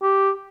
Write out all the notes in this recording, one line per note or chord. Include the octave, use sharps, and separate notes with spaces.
G4